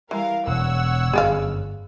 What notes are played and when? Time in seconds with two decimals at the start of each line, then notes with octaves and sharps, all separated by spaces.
0.11 E3 G3 A#4 F5
0.47 E1 C#5 F#5 E6
1.13 G1 F#2 G#4 D5 F5